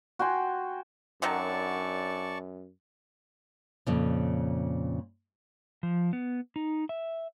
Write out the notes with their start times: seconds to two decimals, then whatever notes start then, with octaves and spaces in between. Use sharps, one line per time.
0.19 F#4 G5 G#5 C6
1.22 F#2 D3 D#3 F#3 D5 A5 C#6
3.87 F2 A#2 C#3
5.83 F3
6.13 B3
6.56 D#4
6.89 E5